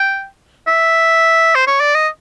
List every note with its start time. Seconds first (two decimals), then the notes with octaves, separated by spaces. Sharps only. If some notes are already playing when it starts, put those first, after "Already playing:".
Already playing: G5
0.67 E5
1.55 C5
1.67 C#5
1.80 D5
1.95 D#5